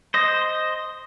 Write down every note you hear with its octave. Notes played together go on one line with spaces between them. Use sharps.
C5 D#5